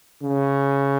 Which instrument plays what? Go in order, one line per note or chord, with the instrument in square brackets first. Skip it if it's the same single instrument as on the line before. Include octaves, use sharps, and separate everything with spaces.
[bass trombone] C#3